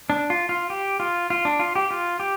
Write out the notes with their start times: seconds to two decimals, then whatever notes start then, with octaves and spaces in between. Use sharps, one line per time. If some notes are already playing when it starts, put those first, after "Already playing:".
0.10 D4
0.30 F4
0.49 F4
0.70 G4
1.00 F4
1.30 F4
1.45 D4
1.60 F4
1.76 G4
1.91 F4
2.20 G4